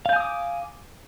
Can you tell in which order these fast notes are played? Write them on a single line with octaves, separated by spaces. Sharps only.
F5 G6 G#5 D#6 D6